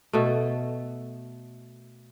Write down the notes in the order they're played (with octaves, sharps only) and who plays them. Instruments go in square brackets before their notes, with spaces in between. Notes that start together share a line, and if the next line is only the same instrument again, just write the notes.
[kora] B2 A3